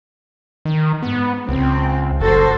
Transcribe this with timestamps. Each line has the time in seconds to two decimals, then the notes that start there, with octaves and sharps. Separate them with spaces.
0.65 D#3
1.03 G#2 B3
1.49 C#2 C4
2.21 F#1 F#4 A4 C5